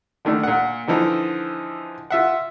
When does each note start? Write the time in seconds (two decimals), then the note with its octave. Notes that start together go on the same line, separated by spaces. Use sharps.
0.25 D3 D#3 A3 D4
0.43 A#2 F#5
0.88 D3 E3 F3 D#4
2.10 F4 E5 F#5